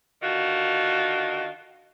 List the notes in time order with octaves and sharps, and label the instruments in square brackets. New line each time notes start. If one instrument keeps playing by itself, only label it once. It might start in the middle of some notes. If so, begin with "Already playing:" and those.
[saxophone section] D3 D#3 F4 F#4